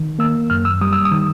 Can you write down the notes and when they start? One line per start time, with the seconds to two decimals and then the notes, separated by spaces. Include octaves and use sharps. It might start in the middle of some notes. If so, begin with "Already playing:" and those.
Already playing: D#3
0.19 A#3 E6
0.50 F#2 F6
0.65 E6
0.81 G3 D#6
0.93 E6
1.05 D#6
1.11 D#3